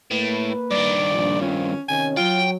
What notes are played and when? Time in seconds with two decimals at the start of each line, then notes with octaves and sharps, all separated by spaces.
0.11 A2 A#3 B4
0.71 G2 D#3 D5
1.12 A#1
1.42 C4 C#4 F4
1.88 C3 D#3 C#4 G#5
2.17 F#3 F4 G5